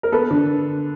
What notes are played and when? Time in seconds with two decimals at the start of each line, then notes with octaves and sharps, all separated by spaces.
0.03 A#4
0.12 B3 A4 B4
0.31 D3